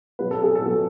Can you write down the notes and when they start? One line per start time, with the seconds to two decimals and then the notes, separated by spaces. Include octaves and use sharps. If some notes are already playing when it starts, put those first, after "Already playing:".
0.19 B2 F#3 B4
0.31 A4
0.43 G#4
0.55 A4
0.62 B2 F#3